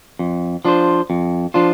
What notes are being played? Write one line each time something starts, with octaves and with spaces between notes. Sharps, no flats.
F2
F3 D4 F4 C5
F2
F3 D4 F4 C5